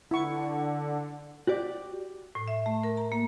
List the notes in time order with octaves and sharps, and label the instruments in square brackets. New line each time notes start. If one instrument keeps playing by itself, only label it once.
[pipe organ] D3 [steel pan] E4 C#6 [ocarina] F#5
[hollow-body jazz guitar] F#4 G4 D5
[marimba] A2
E5
A3
A#4
A#5
A#3